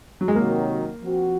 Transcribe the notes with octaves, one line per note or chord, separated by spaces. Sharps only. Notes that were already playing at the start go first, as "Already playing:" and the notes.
F#3
G#3
C3 D#3 F#3 A#3
F3 C4 F#4